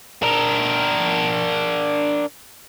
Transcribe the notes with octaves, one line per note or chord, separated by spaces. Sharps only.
D4 A#4